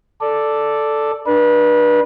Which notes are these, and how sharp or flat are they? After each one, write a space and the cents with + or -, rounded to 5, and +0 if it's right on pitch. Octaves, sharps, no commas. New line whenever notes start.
A4 +0 D5 +0
D4 +25 B4 -30